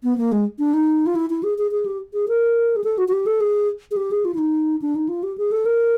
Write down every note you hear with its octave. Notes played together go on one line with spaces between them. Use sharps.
B3
A#3
G#3
D4
D#4
F4
E4
E4
G#4
G#4
G#4
G4
G#4
A#4
G#4
A4
F#4
F#4
G4
A4
G#4
G#4
G4
G#4
F4
E4
D#4
D4
D#4
F4
G4
G#4
A4
A#4